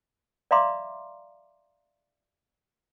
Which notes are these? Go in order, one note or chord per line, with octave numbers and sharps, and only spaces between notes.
D5 E5 F5 A#5 C6 D6